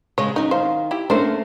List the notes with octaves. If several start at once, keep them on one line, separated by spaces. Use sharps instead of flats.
C#3 G#3 C#5
F#3 C#4 D#4
D#3 C5 F5
E4 G4
A3 A#3 C#4 D4 A#4 C5 E5